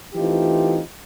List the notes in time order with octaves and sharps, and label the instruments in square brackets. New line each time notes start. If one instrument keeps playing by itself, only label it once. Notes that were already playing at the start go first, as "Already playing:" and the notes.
[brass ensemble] E3 A3 C4 D#4 F4 G4